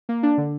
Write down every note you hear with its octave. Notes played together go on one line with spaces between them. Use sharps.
A#3
D4
D3